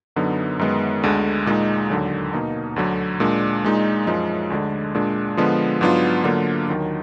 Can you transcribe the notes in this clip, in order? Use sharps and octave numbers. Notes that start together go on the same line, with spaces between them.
F#2 D3 F#3 B3 D#4
F#2 D#3 G#3 B3
D2 D3 G#3
A#2 G#3 D#4
D#2 D3 F#3
B2 A#3 D#4
D2 D3 F#3
A#2 G#3 D4
A#2 G#3 D#4
F#2 F3 G#3
D2 D3 G#3 D4
A#2 G#3 D4
D3 F3 G#3 B3
G#2 F#3 B3 D4 F4
D3 F#3 A#3 D4 F4
D#2 D#3 F#3